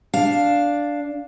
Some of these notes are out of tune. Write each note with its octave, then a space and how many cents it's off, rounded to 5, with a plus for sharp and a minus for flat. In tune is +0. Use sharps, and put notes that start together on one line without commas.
D4 -5 F5 +0